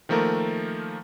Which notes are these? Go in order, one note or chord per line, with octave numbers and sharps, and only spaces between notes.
D#3 F3 A3 A#3 A#4